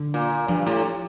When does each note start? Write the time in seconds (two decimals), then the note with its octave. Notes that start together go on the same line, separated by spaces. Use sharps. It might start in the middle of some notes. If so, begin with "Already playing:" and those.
Already playing: D3
0.14 A#2
0.48 G2 F3
0.67 A2